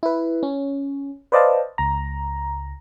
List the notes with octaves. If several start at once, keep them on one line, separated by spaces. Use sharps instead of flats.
E4 B4
C#4
B4 C5 D5 D#5 F5 A5
C#2 A#5